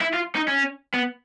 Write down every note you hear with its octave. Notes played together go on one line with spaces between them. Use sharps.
E4
F4
D#4
C#4
B3